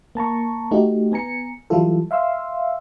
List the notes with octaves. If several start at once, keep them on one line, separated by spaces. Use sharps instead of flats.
A#3 A5 A#5 C#6
A3 D#4 F#4 G4
B3 G#5 A#5 C#7
E3 F#3 G3 E4 F4 A4
E5 F5 C6 E6